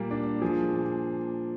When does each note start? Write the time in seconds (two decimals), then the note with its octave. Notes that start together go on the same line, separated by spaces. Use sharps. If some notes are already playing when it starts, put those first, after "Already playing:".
Already playing: A#2 G3 A#3
0.11 D4
0.42 F3 G#4
0.73 A#2